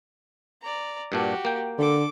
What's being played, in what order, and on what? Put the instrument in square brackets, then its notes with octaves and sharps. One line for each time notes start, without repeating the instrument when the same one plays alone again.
[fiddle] D5 A#5
[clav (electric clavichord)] G2 A#2 D4 [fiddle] F#4 G4
[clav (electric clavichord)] A#3 G5
[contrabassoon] D3 [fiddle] A4 D6